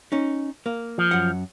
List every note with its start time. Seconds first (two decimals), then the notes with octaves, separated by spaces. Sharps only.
0.12 C#4 D#4
0.66 A#3
0.98 F3
1.11 F#2 F#5